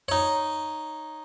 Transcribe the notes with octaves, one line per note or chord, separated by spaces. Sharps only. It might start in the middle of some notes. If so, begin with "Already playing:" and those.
D#4 C#5